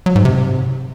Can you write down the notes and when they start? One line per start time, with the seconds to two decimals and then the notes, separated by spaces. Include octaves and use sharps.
0.06 F#3
0.16 G#2
0.25 C3